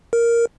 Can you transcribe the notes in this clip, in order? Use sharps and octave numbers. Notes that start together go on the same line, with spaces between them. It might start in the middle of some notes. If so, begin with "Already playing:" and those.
A#4